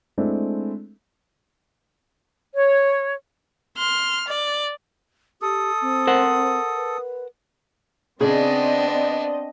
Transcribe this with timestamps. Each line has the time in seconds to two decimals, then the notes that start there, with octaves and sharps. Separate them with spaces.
0.18 G#3 A3 C4 D4 E4
2.54 C#5
3.77 C6 F6
4.27 D5
5.42 G4 A4 D#6
5.81 C4
6.07 A#4 C5 F#5
6.76 B4
8.20 C#3 B3 C4 D4 G#4 D5 D#5